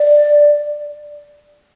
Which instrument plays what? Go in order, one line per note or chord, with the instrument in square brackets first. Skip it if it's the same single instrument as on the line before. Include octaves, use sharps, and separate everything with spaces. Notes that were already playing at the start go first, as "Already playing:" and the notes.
Already playing: [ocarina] D5